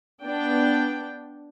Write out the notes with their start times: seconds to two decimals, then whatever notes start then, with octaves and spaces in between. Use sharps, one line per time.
0.24 B3 D4 G5